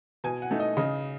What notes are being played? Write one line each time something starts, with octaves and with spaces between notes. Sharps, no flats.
B2 G#5
F#5
A3 D#4
D#5
C#3 D#5